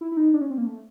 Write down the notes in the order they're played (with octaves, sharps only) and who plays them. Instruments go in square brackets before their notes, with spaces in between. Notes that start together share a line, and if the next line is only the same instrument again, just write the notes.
[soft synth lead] E4
E4
D#4
D4
C#4
C4
A#3
A3